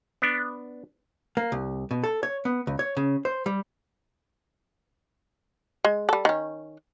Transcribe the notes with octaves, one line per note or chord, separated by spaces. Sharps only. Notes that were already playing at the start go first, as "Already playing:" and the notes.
B3 D4
A#3
C2
B2
A4
C#5
B3
C#2
C#5
C#3
C5
G3
G#3
G3 A4
D#3 C#4